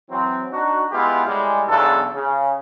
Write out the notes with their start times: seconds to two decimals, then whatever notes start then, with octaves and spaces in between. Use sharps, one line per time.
0.11 E3 F#3 C4
0.53 D4 D#4 F#4
0.92 G#3 B3 E4 F4 G4
1.26 A2 G3 G#3
1.69 B1 E2 C#3 D4 A4
2.15 C#3